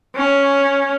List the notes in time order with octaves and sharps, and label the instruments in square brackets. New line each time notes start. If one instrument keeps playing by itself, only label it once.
[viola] C#4